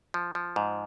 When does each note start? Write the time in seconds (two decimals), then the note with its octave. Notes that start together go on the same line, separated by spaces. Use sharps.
0.14 F3
0.35 F3
0.56 G#2